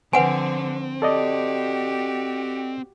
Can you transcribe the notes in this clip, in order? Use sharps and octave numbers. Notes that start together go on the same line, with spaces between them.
D3 F3 C4 B4 C5 F#5 G#5
F#4 G4 A4 D5 D#5